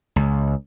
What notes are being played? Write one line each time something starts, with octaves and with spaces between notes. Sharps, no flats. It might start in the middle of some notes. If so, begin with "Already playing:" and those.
C#2